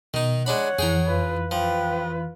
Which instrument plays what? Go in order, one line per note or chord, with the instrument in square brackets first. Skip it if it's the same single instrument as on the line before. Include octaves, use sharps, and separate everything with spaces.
[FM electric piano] B2 [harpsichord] D#3 D#4
[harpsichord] G#3 D4 B5 [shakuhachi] C#5 [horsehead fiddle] F#5
[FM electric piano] F2 E3 [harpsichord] G#4 G5 A#5
[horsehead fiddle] F4 B4
[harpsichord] F3 [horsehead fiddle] F4 B4 [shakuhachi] G5